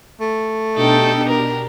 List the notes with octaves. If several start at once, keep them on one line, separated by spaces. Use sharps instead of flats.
A3
B2 D4 D#4 G4 A4 G5
A#4